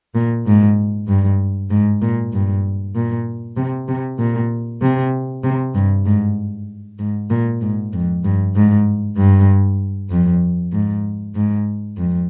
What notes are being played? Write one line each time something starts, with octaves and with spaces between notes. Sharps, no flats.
A#2
G#2
G2
G#2
A#2
G2
A#2
C3
C3
A#2
C3
C3
G2
G#2
G#2
A#2
G#2
F2
G2
G#2
G2
F2
G#2
G#2
F2